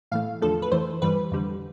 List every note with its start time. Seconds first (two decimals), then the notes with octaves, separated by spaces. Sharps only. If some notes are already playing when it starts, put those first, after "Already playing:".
0.11 A2 E3 A3 F5
0.42 E2 D3 F3 A3 A4
0.62 B4
0.72 F2 E3 A3 C5
1.02 G2 E3 G3 B4
1.32 F2 D3 G3